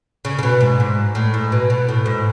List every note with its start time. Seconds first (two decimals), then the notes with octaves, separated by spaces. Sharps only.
0.25 C#3
0.39 C#3
0.43 B2
0.61 G#2
0.80 G#2
1.15 A2
1.34 G#2
1.52 B2
1.70 B2
1.89 A2
2.06 G#2